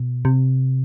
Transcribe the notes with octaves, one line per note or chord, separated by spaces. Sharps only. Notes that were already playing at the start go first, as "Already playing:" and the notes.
Already playing: B2
C3